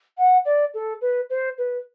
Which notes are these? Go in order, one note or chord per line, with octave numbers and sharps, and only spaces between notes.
F#5
D5
A4
B4
C5
B4